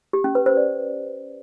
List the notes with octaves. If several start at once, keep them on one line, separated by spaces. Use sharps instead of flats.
G4
C#4
B4
C5
D5